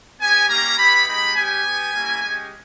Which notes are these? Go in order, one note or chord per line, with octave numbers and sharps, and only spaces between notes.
B3 G4 G#5
G3 A#3 C#4 G4 A#5
B3 E4 G4 B5
G#3 D#4 G4 B5
G3 B3 G4 G#5
B3 G4
G3 A#3 C#4 E4
G#3 C#4 G4